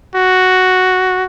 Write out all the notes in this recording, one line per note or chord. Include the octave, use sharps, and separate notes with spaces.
F#4